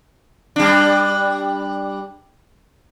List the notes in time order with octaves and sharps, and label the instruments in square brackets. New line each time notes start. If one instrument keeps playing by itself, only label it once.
[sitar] G3 D4